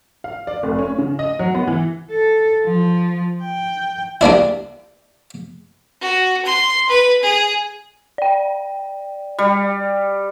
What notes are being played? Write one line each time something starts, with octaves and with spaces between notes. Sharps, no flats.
F5
D5
F1
C#4
C#3
D#5
F#3
B3
E3
A4
F3
G5
G3 A#3 D4 E4
F#4
C6
B4
G#4
D5 G5
G3